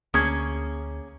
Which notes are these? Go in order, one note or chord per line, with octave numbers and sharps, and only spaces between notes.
D2 A#3 C#4 G#4 D#6 G#6